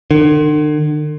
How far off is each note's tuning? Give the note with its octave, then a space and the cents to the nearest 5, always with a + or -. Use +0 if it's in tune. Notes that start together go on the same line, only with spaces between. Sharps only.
D3 +45